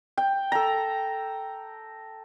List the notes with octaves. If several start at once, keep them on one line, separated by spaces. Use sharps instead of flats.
G5
A4 A#5